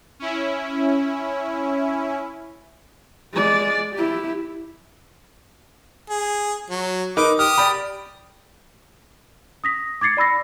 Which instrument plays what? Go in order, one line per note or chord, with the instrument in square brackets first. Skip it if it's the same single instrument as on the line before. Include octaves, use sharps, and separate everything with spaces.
[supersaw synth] C#4 E4
[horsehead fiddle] G#3 D5
E4 G4
[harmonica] G#4
F#3
[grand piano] D#4 A#4 B4 [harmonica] D6
[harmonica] G4 D#6 [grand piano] F6
[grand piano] D5 G5 B5
[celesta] D#6 A#6 B6
D6 G#6 A6 C7 C#7
D5 B5 E6 A#6